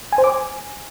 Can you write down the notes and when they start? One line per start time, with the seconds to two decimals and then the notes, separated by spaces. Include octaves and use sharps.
0.12 G#5
0.18 C5
0.24 D6
0.30 G#5